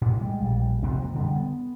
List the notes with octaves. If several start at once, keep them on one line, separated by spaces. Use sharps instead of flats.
A2
G3 G#3
A#1 G3
F2 C3 A#3 C4
D3 G3
B3